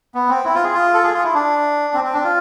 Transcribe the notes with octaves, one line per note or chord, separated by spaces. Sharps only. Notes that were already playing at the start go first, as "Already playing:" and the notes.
B3
C4
E4
F4
G#4
F4
A4
G#4
F4
E4
D4
C4
C4
D4
F4